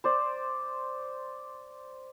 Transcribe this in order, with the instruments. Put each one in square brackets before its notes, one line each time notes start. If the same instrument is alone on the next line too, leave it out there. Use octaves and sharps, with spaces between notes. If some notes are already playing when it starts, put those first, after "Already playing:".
[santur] C5 D5